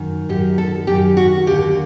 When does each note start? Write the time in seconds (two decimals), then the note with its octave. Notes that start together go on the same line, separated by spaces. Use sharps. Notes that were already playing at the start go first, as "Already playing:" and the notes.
Already playing: F#2 D#3
0.29 F#2 D#3 G4
0.58 A4
0.87 F#2 D#3 G4
1.17 F#4
1.47 D#2 D3 G4